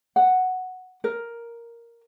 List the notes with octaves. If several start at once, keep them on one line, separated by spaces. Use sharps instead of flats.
F#5
A#4